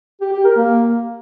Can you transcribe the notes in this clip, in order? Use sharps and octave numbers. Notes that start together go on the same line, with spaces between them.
G4
G4
A#4
A#3